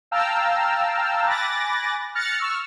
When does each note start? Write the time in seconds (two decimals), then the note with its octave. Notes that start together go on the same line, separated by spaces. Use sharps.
0.11 F5 G5 A5 A#5 E6 F6
1.26 G#5 B5 D6 F#6 A6 A#6
2.15 F6 F#6 A6 A#6 C#7
2.38 C#6 E6 F6